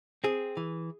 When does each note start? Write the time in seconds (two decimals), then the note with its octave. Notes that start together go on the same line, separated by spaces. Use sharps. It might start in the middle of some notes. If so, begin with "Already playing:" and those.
0.24 C4 G#4
0.57 E3